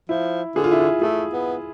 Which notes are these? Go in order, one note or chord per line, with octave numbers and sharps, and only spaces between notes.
F3 E4
D3 G#4
F4
E4
F4
A3 G#4
B3